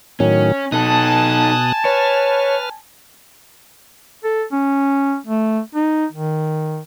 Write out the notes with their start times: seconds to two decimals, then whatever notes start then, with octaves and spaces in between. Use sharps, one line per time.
0.20 A2 D#3 F#3 C#4
0.72 B2 D#4 A4 G#5 A5 D#6 F#6
1.85 B4 C#5 F6
4.24 A4
4.52 C#4
5.26 A3
5.75 D#4
6.12 D#3